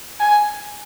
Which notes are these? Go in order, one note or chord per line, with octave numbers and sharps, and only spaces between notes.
G#5